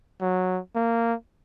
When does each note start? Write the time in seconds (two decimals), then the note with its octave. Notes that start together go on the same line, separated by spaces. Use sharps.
0.21 F#3
0.75 A#3